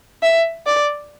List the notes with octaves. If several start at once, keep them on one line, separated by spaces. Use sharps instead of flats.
E5
D5